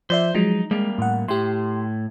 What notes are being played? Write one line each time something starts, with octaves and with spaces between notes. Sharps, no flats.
F3 C5 D5 E5
F3 F#3 G#3 D#4
G3 G#3 A#3
A2 F#5
A2 G4 C6